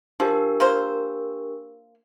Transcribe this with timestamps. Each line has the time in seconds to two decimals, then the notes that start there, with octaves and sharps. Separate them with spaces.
0.20 F3 D4 G4 A#4
0.60 A#3 F4 C5